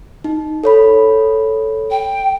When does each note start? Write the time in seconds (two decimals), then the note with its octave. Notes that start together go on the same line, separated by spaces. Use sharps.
0.24 D#4
0.64 A4 C#5 B5
1.91 G5